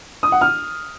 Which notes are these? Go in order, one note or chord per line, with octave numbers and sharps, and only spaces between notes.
D#6
F#5
F6